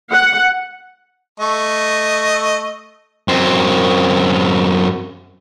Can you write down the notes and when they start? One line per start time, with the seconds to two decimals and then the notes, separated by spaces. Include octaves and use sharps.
0.11 F#5
1.40 A3 D#5 C#6
3.28 F#2 C4